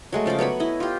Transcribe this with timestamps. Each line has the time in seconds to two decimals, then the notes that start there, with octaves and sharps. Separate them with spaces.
0.12 F#3 G#3 A3
0.26 C#3 F3 D5 D6
0.39 F#3 B3 C#5 B5
0.60 E4 D#5
0.80 F4 G4